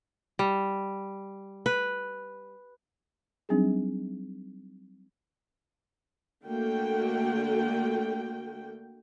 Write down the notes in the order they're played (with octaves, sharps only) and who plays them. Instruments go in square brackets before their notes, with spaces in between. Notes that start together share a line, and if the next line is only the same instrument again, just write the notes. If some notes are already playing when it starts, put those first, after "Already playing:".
[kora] G3
B4
[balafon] F#3 G3 C4 D4 D#4 G#4
[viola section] D3 A3 A#3 F#4 G5